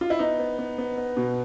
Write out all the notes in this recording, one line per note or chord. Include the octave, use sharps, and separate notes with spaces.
F4
E4
B3 D#4
B3
B3
B3
B3
B2